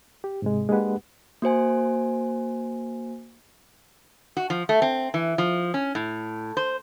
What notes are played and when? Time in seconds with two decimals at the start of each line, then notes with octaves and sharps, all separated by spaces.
0.24 G4
0.42 G#2 C3 G#3
0.69 G#3 A#3 D4 G4 B4 F#5
1.42 A#3 F#4 C5 G#5
4.37 F#4
4.50 F3
4.69 A3
4.82 C4
5.14 E3
5.38 F3
5.74 C#4
5.95 A2
6.57 C5